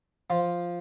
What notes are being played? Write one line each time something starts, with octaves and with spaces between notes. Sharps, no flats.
F3 F4